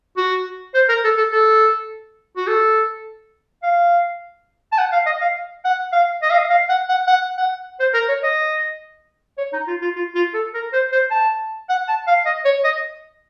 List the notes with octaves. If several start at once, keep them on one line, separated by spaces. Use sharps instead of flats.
F#4
C5
A#4
A4
A4
A4
F#4
A4
F5
A5
F#5
F5
D#5
F5
F#5
F5
D#5
F5
D#5
F5
F#5
F#5
F#5
F#5
C5
A#4
C#5
D#5
C#5
D#4
F4
F4
F4
F4
A4
A#4
C5
C5
A5
F#5
A5
F5
D#5
C#5
D#5